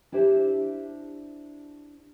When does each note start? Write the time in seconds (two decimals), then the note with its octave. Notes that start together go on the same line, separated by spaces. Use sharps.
0.12 D4 E4 G4 C5